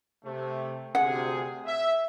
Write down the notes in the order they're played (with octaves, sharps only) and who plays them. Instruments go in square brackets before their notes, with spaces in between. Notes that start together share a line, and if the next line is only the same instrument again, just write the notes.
[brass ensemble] C3 A3
[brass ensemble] D2 C3 G#4 [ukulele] F#5
[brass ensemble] E5